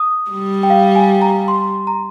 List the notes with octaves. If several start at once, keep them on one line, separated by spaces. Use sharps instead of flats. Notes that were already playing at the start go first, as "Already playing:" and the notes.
Already playing: D#6
G3
G5
F5
G#5
A#5
C6
A#5